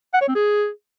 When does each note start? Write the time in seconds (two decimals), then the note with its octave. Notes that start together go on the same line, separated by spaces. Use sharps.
0.14 F#5
0.21 C#5
0.28 C4
0.35 G#4